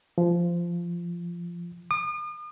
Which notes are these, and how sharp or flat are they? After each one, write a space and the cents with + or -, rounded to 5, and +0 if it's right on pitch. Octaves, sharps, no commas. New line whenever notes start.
F3 -15
D#6 -45